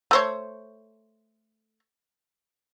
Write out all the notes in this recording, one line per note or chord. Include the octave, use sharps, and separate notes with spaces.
A3 C5 C#5